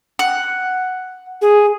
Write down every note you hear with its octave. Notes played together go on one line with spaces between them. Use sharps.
F#5
G#4